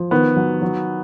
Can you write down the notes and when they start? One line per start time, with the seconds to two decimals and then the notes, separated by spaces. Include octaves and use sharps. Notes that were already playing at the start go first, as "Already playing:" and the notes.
Already playing: F3
0.11 D#3 B3
0.36 F#3
0.62 F#3